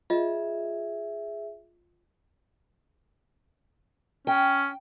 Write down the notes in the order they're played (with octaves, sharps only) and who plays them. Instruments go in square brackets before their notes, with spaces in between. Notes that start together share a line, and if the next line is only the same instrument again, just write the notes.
[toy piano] F4 D#5 [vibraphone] G#4 E5
[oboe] C#4 [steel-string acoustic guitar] G5